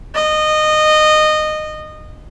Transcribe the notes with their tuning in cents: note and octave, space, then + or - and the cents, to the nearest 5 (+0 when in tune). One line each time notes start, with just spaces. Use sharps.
D#5 -20